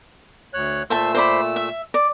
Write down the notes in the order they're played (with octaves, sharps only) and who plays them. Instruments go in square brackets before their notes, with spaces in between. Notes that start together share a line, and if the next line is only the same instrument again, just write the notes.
[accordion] D2 C#5 F#6
[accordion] A#2 A3 E6 [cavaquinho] C5 E5 A5
[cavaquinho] C5 D5 B5
E5
D5